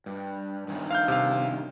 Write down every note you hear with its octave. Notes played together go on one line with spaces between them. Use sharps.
G2
G2 D#3
F5 F6 G6
C3 F5